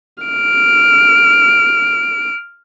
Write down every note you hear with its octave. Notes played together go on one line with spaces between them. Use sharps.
F6 D7